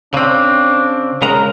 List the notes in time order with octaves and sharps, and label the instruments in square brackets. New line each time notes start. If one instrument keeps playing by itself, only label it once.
[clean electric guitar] C#3 C4 [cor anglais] D4
[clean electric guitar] C#3 G#3 A#5 [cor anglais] A#4